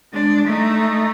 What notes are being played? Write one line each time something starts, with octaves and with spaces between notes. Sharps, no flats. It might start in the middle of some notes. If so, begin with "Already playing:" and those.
G#3 D4
A3 D#4